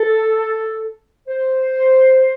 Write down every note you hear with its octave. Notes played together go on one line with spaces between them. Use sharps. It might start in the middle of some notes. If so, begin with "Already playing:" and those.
Already playing: A4
C5